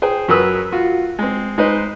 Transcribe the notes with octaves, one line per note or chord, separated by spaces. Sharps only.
G#4 C5 G5
F#2 F#3 A#4 B4 D#6 E6
F4 F#4
G#3 C4
G#3 D#4 B4 C5